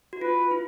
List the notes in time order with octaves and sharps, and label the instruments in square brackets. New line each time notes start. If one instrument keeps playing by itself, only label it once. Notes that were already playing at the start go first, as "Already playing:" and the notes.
[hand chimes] F#4
[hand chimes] F4 [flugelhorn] B4
[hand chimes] E4